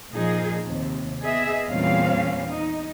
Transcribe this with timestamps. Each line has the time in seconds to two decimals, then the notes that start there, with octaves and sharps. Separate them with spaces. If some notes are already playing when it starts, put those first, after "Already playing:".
0.14 A#2 F3 D#4 G#4
0.68 D#2 C3
1.22 B3 G#4 D#5 E5
1.69 E2 A#2 G3 C4 C#4 F5
2.48 D#4